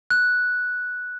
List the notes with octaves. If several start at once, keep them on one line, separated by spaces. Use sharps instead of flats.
F#6